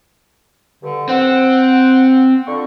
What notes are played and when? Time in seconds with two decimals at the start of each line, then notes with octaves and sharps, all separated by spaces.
0.82 G2 D3
1.09 C4 F#5
2.46 D3 F4 C#6